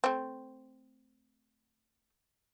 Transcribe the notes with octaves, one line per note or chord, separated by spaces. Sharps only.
A3 C4